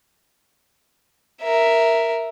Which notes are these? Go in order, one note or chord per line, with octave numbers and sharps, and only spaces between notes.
A#4 E5